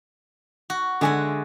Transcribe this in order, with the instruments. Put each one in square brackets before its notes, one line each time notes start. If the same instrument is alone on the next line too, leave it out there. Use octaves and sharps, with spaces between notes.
[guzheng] F#4
[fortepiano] D3 G#5 [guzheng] G#3 E5 F#5